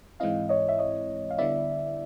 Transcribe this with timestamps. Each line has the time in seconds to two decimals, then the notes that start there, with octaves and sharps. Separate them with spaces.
0.20 G#2 E3 G#3 C4 E4 D#5 F5
0.49 C#5 D#5
0.69 E5
0.79 C#5 D#5
1.30 F5
1.38 D3 G3 B3 E4 D5 E5